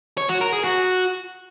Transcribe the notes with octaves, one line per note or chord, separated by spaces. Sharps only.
C#5
F#4
A#4
G#4
F#4